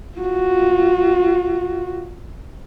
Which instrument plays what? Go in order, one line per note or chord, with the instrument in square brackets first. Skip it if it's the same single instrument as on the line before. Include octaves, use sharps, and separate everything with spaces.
[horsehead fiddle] F4 F#4